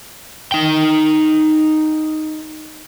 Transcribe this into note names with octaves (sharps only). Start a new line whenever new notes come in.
D#4 G5